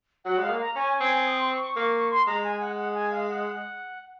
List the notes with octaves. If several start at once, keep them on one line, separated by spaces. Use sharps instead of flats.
F#3 F#5
G#3
F5
A#3
A#5
C#4 G#5
C4 G#5
D#6
C6
C#6
C#6
A#3 C#6
C#6
C6
G#3 A#5
G#5
F#5
F#5
G#5
F5
F#5